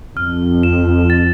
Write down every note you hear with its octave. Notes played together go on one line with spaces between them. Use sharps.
F2 F6
E7
A6